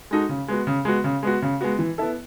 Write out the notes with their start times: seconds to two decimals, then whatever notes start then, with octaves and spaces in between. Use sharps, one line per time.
0.11 G#3 D#4 F#4 A4
0.29 C#3
0.48 G#3 B3 F#4
0.67 C#3
0.85 G#3 B3 F#4
1.04 C#3
1.23 G#3 B3 F#4
1.42 C#3
1.61 G#3 B3 F#4
1.79 E3
1.98 B3 E4 A4